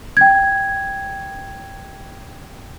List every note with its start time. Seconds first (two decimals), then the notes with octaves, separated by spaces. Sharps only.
0.17 G5 G#6